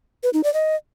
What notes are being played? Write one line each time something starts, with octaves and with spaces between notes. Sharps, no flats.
B4
D#4
D5
D#5